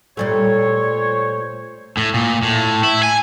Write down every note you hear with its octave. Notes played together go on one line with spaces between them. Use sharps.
A#2 G3 A3 C5 C#5
A2
A#2
A2
E4
G#5